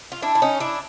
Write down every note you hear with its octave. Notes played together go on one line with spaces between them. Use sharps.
F4
D4 E4
E4
C#4 D#4
D4 E4